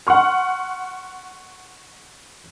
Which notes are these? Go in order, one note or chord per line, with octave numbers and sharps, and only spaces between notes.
F#5 C6 C#6 F6